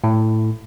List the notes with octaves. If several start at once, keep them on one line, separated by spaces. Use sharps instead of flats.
A2